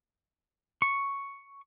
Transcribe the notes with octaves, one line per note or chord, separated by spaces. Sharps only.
C#6